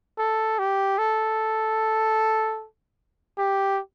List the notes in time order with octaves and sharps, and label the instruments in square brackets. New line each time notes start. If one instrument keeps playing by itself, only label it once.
[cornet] A4
G4
A4
G4